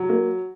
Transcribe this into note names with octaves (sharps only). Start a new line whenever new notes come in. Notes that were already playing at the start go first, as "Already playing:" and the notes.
Already playing: F#3
A#3